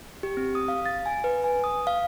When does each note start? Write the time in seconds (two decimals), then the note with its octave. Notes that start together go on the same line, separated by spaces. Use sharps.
0.23 G4
0.37 C4
0.55 D#6
0.68 F5
0.86 A6
1.06 G#5
1.24 B4
1.44 G#5
1.64 D#6
1.87 F5